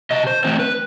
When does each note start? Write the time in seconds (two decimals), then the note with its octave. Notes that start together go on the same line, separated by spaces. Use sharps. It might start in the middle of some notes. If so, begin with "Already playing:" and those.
0.11 C3 D#5
0.27 C5
0.44 E3 A3 C4 C5
0.59 B4